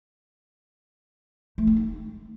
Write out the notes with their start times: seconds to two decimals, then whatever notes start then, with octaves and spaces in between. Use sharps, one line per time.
1.58 A3
1.67 C4
1.77 D#4